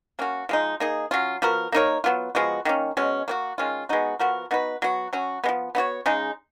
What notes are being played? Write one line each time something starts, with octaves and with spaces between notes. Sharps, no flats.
A#3 C#4 F#4
F3 G#3 D#4
A#3 D#4 G#4
F#3 C#4 F4
F3 B3 F#4 A#4
A#3 D#4 A#4 C#5
F#3 B3 F4
F3 G#3 B3 F#4
D#3 A#3 C#4
B2 G#3 C#4
A#3 C#4 F#4
D#3 G#3 C#4 F4
G#3 B3 D#4 F#4
F3 B3 F#4 A#4
B3 D#4 F#4 B4
F#3 B3 F#4
F#3 C#4 F#4
G#3 B3
F3
B3 D#4 F#4 C#5
C#3 G#3 D#4